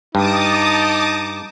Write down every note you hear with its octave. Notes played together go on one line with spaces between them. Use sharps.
G2 D#4 A5 D6 D#6